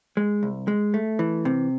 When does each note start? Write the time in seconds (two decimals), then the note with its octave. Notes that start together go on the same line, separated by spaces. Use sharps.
0.17 G#3
0.43 C2
0.68 G#3
0.94 A3
1.19 E3
1.45 C3